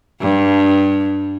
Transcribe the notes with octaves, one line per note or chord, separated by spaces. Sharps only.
G2